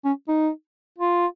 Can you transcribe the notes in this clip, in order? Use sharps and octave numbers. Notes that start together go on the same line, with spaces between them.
C#4
D#4
F4